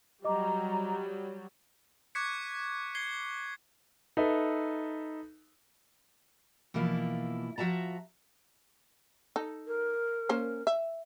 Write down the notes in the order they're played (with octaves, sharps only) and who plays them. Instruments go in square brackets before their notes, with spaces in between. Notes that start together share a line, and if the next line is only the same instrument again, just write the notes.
[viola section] F#3 G3 [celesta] D#5 D6 [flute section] A#5
[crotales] C#6 D6 F#6 G#6 B6 C#7
G#6 C7 G7
[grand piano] D#4 A4 B4 E5
[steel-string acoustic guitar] B2 E3 F3 A#3 E4 F4
F3 F#4 E5 A5 A#5
[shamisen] D#4 A4
[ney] A#4
[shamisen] A#3 C#4 C5
E5